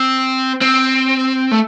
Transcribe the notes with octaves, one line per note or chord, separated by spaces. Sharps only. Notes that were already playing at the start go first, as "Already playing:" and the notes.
Already playing: C4
C4
A3